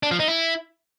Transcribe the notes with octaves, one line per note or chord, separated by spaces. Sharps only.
D4
F3
D#4
E4